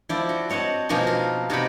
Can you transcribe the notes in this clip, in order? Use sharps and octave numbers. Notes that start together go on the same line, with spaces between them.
F3 E4 D5
F#4
C4 C#5 D#5 F#5 A5
B2 F3 A#3 D#4 F#4 G#5
F4
C3 D#4 F#4 C#5 D5 B5